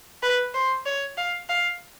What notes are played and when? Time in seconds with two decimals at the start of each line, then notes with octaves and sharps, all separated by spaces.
0.23 B4
0.54 C5
0.86 C#5
1.17 F5
1.49 F5